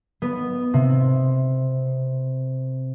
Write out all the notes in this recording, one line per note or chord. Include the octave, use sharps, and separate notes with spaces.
B3
C3